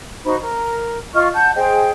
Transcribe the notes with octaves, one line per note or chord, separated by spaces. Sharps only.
D#4 F#4 C5 B5
A#4
F4 D#5 C#6 F6
F#5 A5 G6
G#4 C5 D#5 G5